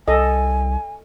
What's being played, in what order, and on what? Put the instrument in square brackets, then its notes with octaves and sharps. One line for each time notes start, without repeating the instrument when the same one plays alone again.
[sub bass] C2 [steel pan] A4 D#5 [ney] G#5